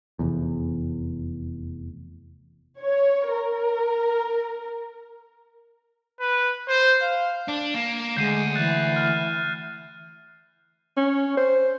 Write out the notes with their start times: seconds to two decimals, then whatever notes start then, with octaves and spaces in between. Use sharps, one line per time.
0.19 F1 E2
2.80 C#5
3.34 A#4
6.20 B4
6.68 C5
7.01 F5
7.48 D4
7.74 A#3 E7
8.17 D2 G#3 G6 C7 D#7
8.55 E3 F#6 A6
8.96 F6
10.97 C#4
11.37 C5